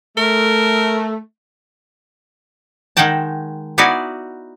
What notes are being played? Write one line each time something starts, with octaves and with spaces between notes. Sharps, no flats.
A3 A#4
D#3 G#3 D#4 F#5 G5 A5
B3 D#4 E4 F#4 D5 G#5